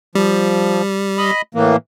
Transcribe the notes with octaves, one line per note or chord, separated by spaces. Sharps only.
F3 G3
D#5 B5
A2 E3 A#3